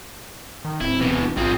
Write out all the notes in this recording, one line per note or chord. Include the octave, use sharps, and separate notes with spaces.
D#3
D1 C4 E4
B2 E3
D4
A#1 C4 F4 G#4